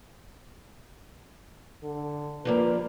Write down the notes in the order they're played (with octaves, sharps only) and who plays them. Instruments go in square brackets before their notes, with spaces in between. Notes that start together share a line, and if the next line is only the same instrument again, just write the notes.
[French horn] D3
[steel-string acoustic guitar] F3 G3 A#3 [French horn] B4